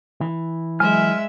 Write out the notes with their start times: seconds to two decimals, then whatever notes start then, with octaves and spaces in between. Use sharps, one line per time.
0.21 E3
0.80 F#3 G#3 E5 G#5 F6